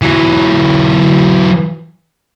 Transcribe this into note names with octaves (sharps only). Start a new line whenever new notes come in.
E3 F#3